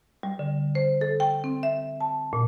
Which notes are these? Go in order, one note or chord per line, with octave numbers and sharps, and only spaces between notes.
G3
D3
C5
A4
G5
C4
E5
A5
A#2